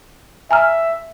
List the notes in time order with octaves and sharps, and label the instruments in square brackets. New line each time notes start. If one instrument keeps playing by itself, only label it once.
[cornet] E5 [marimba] G#5 A#5 F6